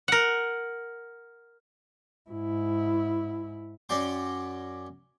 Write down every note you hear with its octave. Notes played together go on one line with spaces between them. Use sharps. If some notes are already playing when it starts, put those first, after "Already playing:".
A#4 F#5
G#2 E4
F#2 C#4 D5 G5 C6